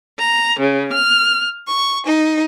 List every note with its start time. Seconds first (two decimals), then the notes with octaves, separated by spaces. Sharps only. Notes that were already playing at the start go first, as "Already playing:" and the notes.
0.18 A#5
0.60 C#3
0.93 F6
1.66 C#6
2.04 D#4